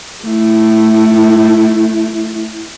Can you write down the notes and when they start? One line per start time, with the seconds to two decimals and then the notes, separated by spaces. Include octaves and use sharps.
0.24 A3 E4